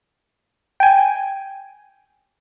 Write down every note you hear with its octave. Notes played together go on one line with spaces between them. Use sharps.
G5 G#5